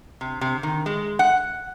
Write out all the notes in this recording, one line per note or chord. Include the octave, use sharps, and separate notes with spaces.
C3
C3
D#3
G#3
F#5